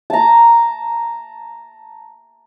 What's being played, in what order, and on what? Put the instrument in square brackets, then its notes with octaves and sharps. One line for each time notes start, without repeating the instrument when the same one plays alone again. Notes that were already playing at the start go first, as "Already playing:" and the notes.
[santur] A5 A#5